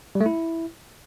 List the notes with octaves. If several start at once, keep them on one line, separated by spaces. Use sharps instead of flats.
G3
A3
E4